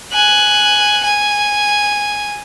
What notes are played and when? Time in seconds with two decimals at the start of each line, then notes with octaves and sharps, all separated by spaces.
0.13 G#5 F#6
1.04 G#5